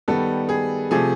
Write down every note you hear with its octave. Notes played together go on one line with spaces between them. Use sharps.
D#3 G3 B3 A4
G#4
C3 F3 A3 G#4